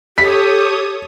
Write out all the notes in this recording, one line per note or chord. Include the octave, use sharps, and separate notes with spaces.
G4 A4 C#5 D#6 B6